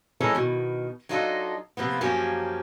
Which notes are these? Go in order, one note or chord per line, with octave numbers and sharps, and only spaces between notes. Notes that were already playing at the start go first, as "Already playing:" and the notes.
E3 G#3 C#4 A4 A#4
B2 D#3
F#3 D4 D#4 F4 A4 D#5
C3 F3 A#3 B3
F#2 F3 A#3 C#4 G4 G#5